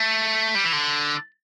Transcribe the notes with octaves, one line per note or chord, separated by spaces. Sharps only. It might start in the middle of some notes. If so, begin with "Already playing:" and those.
Already playing: A3
G3
E3
D3